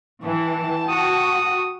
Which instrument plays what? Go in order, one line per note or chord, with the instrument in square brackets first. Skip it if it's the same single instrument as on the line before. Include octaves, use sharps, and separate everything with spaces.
[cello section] E3 [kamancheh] G5 A5
[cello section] F#4 [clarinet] D#6